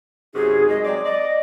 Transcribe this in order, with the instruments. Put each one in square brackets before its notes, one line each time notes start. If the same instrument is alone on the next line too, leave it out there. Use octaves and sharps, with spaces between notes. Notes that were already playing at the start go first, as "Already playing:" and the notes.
[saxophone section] F#2 C3 D#4 [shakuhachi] G#4
[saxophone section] G#3 [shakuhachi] D#5
[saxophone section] F#3 C4 D5 [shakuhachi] D6
[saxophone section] D5 [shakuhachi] D#5